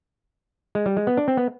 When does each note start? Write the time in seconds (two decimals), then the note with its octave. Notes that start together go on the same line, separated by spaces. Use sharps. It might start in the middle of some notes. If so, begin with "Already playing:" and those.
0.75 G#3
0.86 G3
0.97 G#3
1.07 B3
1.17 D4
1.28 C4
1.37 B3